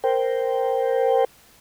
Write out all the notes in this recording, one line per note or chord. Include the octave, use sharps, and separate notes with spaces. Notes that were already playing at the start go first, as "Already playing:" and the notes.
A#4 C5 G5